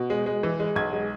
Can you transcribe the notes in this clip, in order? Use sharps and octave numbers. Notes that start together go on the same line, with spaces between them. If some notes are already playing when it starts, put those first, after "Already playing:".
Already playing: B2
G#3
G#3
E3
G#3
B1 G#6
G#3